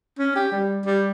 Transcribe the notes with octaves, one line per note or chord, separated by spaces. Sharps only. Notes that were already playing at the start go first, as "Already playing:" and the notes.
C#4
G4
G3
G3